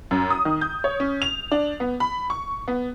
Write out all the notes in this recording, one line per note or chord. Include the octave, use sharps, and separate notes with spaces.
F#2
D#6
D#3
G6
C#5
C#4
F7
D4
B3
B5
C#6
B3